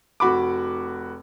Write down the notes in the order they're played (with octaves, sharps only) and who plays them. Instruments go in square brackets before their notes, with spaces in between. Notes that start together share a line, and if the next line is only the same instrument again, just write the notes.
[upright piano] F1 F#4 B5 D6